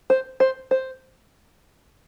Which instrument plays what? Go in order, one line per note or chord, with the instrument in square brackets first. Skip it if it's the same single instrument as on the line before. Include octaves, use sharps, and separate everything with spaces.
[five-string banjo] C5
C5
C5